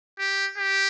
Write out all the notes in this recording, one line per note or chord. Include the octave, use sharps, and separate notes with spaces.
G4
G4